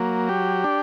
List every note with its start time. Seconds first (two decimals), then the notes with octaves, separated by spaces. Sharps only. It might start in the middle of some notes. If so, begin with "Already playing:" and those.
Already playing: F#3 A#3
0.29 G4
0.64 D4